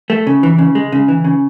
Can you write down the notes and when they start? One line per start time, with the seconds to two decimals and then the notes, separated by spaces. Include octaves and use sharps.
0.10 A3
0.27 C#3
0.43 E3
0.58 C#3
0.75 G#3
0.92 C#3
1.08 E3
1.24 C#3